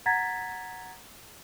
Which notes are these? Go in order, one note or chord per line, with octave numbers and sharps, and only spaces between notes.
F#5 A#5 G#6 A6 B6